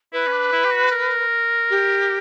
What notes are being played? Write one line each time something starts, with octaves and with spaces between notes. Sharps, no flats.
E4 B4
C#4
D4
E4
G4
F#4
A#4
G4